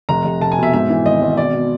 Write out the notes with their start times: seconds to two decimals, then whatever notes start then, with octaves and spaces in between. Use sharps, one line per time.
0.09 F1 A#5
0.25 F1
0.41 F1 A5
0.52 G#5
0.58 B2
0.63 E5
0.73 G#2 E5
0.90 E3
1.05 G#1 D#5
1.22 G#1
1.37 B2 D5
1.53 B2